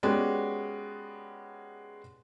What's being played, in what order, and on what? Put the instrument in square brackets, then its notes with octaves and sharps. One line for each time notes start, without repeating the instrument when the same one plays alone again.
[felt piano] G#3 B3 C#4 F#4 G4 D5